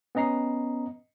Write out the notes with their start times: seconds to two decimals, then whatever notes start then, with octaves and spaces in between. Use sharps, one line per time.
0.15 B3 C#4 D#5 A#5 C7